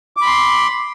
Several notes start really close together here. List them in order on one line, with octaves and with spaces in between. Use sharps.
D6 B5 C6